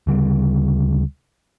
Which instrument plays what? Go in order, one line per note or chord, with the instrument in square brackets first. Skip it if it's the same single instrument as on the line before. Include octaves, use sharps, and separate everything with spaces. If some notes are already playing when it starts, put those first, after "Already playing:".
[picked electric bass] D2 C#3 G3